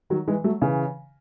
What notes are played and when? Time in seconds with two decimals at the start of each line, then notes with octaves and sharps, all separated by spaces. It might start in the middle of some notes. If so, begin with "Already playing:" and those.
0.10 D#3 F#3
0.28 E3 G#3
0.44 F#3 A3
0.62 C#3 E3